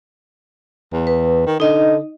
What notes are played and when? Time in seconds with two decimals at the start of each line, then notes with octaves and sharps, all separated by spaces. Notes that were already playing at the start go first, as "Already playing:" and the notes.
0.92 E2
1.07 B4
1.47 D#3
1.60 D3 D#4 D#5